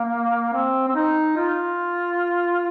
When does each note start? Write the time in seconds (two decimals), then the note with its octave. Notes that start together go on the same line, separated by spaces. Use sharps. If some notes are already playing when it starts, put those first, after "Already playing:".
Already playing: A#3
0.53 C4
0.88 C4
0.95 D#4
1.36 F4